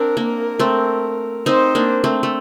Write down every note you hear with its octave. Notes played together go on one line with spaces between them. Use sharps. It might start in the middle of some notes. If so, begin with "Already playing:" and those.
Already playing: C4 D4 A#4
A#3
A3 C4
C4 D#4 C5
A#3 D4
A3 C4
A3